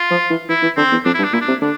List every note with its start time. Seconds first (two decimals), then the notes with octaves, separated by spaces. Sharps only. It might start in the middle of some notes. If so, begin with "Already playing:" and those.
Already playing: F4
0.11 F3
0.30 E3
0.49 E3 E4
0.62 E3
0.77 D3 C4
0.92 E2
1.05 F2 D4
1.14 E4
1.19 G2
1.24 D4
1.33 A#2 E4
1.41 D4
1.48 C3
1.62 D3 D4